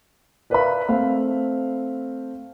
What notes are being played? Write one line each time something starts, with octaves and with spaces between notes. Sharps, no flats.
A#4 B4 D5 E5 F5 B5
A3 C4 F5